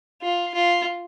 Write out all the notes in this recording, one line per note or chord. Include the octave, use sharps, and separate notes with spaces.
F4
F4